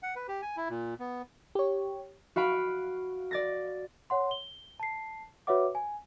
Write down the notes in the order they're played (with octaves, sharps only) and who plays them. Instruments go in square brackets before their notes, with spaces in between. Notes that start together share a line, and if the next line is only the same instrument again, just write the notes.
[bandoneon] F#5
B4
G4
G#5
E4
A#2
B3
[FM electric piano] G4 C#5
[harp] F#4 F5 B5 D7
D5 A6 A#6
[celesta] C#5 F#5 C6
G7
A5 C7
F#4 B4 C#5 E5 F#5 D6
G#5